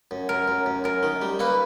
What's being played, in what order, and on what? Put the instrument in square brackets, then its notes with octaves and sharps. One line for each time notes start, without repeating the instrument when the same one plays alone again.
[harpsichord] F#2
[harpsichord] F#2 [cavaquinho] A#4
[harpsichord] F#2
F#2
[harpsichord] F#2 [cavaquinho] A#4
[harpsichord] D#3
G3
[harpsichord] A#3 [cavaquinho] B4